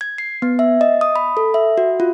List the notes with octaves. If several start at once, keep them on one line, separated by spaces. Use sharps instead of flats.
G#6
C7
B3
E5
D#5
D#6
B5
A4
E5
F#4
F4